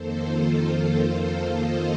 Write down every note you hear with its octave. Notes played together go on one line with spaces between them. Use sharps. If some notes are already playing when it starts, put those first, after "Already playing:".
Already playing: F2 D#3 A#3 A4 C5
F4 A4
A4 C5
C5 D#5